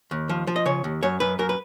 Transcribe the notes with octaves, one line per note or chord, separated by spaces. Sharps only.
D#2
F3
F3
D#5
C#3 C#5
D#2
F#2 C#5
F#2 B4
F#2 A#4
B4